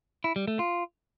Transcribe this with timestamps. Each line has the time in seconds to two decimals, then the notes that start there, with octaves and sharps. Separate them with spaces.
0.24 E4
0.36 G3
0.48 A3
0.59 F4